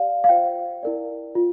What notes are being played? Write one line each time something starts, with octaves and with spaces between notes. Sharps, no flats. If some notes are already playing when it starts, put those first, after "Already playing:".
Already playing: G4 D5 F5
F5
F4 C5 G5
E4 A#4 D5
F4